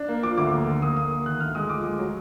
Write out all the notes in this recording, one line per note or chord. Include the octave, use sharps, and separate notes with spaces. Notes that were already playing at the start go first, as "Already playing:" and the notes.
Already playing: D4
A#3
F3 D6
D2 D6
A#3
D3
A#3 D#6
A#3 D#6
A#3 D#6
D#3 F#6
D2 F6
G#3 D#6
F3 D6
G#3
F#3